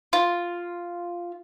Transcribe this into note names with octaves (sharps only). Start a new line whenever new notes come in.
F4